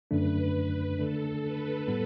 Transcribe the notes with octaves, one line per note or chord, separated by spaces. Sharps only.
F#2 D3 A3 D4 B4
D3 A3 D4 A4
B4
A2 G3 B3